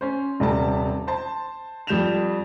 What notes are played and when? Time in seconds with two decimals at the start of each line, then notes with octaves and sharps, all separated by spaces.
0.01 C#4 C5
0.40 D#1 C3 G3 A5
1.07 C5 A5
1.87 F2 G3 G6 E7 F7